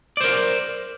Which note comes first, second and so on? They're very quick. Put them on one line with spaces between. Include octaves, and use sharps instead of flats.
D5 C5 A#4